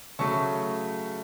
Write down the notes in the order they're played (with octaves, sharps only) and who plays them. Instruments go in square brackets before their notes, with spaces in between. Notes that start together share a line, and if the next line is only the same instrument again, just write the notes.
[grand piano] C#3 F#3 A3 A5 C#6